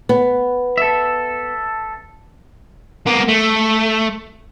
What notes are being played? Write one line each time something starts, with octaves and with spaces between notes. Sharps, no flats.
B3
A4 E5
A#3 B3
A3